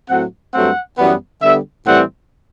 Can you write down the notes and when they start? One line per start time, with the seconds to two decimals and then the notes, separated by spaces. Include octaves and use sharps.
0.09 A2 F#3 C4 F#5
0.54 G2 F#3 A3 C4 F#5
0.97 F#2 E3 G3 B3
1.42 D3 G3 B3 E5
1.86 A2 E3 G3 C4 F#5